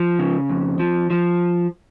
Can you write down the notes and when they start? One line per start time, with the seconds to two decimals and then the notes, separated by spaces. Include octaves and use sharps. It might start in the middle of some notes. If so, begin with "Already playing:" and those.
Already playing: F3
0.19 C#3
0.49 F2
0.79 F3
1.10 F3